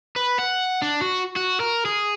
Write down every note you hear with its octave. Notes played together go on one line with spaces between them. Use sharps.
B4
F#5
D4
F#4
F#4
A#4
G#4